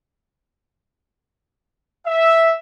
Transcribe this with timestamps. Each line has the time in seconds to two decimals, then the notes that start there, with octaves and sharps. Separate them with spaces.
2.07 E5